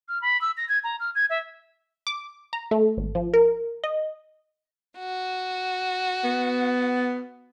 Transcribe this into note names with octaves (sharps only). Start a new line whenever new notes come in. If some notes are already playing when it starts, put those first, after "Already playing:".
F6
B5
E6
A#6
G#6
A#5
F6
G#6
E5
D6
A#5
A3
G#1
F3
A#4
D#5
F#4
B3